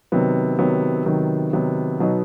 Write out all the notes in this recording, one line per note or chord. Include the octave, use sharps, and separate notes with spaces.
C3 D#3 F#3 B3
C3 D#3 F#3 B3
C3 D#3 F#3 B3
C3 D#3 F#3 B3
B2 F#3 B3 D#4